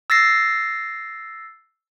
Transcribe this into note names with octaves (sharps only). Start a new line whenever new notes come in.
E6 A6 A#6 C7